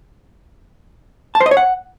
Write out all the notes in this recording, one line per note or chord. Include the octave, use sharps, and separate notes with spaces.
A5
C5
D#5
C#5
F#5